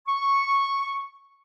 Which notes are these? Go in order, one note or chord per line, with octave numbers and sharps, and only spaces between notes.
C#6